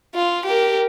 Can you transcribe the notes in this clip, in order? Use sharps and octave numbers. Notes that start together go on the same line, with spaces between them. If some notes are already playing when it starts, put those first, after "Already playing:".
F4
G4 A#4